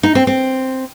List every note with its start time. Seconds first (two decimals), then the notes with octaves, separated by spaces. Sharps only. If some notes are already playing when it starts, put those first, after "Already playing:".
0.03 D#4
0.15 C4
0.27 C4